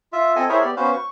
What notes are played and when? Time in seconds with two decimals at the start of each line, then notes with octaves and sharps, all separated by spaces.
0.13 F4 E5
0.36 C4 A4 D#5 G#5
0.49 E4 G#4 A#4 C5 C#5 E5
0.62 B3 G4 D5
0.76 B3 C#4 F#4 B4 C5 F5
0.93 C#6